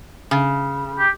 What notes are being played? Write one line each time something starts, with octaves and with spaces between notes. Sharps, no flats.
C#3
G4